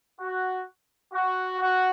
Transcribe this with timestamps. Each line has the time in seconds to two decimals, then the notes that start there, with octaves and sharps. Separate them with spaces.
0.20 F#4
1.13 F#4
1.60 F#4